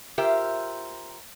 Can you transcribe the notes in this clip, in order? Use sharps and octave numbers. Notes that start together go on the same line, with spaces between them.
F4 G4 A#4 C5 E5